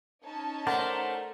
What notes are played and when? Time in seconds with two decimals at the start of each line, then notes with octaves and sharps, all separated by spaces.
0.24 C#4 D#4 A5
0.67 A3 A#4 C5 D5 F#5